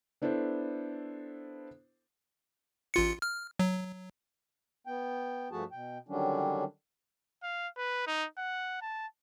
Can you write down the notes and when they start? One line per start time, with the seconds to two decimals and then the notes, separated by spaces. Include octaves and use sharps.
0.22 B3 D4 E4 A4 C5
2.94 A1 F4 C#7
3.22 F6
3.59 F#3
4.87 B3 G5
5.51 G2 F3 A3 F#4 G#4 A5
5.72 B2 G5
6.08 D3 D#3 F#3 G3 C#4 D4
7.43 F5
7.77 B4
8.07 D#4
8.38 F#5
8.82 A5